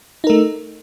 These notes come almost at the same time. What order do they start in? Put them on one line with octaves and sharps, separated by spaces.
D#4 A#4 A3